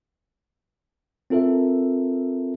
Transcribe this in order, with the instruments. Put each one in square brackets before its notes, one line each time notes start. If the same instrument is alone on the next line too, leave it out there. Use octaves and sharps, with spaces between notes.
[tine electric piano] C4 F4 A4 A#4 E5